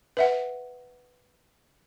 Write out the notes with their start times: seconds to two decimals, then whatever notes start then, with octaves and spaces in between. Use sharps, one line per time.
0.17 B4 E5 F#5